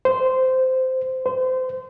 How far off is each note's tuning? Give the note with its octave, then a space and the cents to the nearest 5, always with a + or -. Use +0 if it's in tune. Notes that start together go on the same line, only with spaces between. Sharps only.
C5 -15
C5 -30